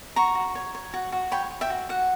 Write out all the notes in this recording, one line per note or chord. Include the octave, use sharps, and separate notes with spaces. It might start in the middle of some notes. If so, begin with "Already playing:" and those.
F#4 A#5 C#6
F#4
C#5
C#5
F#4
F#4
C#5 G5 B5
C#5
E5 G5
F#4
F#4 F#5